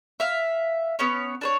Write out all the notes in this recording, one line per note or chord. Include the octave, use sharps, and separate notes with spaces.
E5 F5
B3 C#4 C#5
D4 C5 C#5